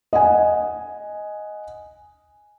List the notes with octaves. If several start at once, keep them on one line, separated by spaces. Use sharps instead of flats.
D#5 F#5 G#5